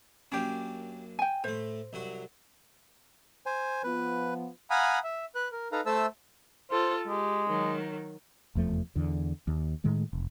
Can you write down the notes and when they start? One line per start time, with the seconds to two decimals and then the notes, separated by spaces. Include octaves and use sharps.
0.32 F#2 A#3 C#4 D4 G4
1.19 G5 G#5
1.44 A2 A3 C5
1.93 C2 F#3 F#4
3.46 C5 G#5
3.84 F3 B3 B4
4.70 F5 F#5 G#5 A#5 B5 D#6
5.04 E5
5.35 B4 F#6
5.52 A#4
5.72 D#4 A4 B4 F5 A#5
5.86 A3 A4 C5 E5 A5 E6
6.71 F4 A4 C5
7.08 G#3 G4
7.47 D#3 F#3
8.55 F1 E2 F3 A3
8.96 E2 D3
9.47 D#2
9.84 A2 D#3 G#3 A3
10.13 F1